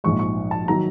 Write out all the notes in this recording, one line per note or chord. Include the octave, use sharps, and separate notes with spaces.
A#1 G#2 F3 G#3 C#6
C#6
A5
D#3 F#3 A#5